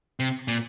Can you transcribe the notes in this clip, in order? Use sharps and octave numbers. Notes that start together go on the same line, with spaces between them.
C3
A#2